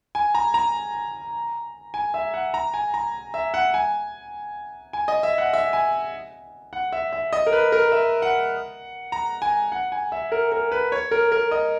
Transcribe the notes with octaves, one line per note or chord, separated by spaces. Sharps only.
G#5
A#5
A#5
G#5
E5
F#5
A#5
G#5
A#5
E5
F#5
G#5
G#5
D#5
E5
F#5
E5
G#5
F#5
E5
E5
D#5
A#4
B4
A#4
E5
F#5
A#5
G#5
F#5
G#5
E5
A#4
A#4
B4
C#5
A#4
A#4
D#5